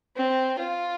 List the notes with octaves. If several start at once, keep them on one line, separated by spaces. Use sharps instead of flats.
C4
F4